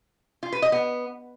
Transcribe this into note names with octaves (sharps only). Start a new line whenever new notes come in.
F4
B4
D#5
B3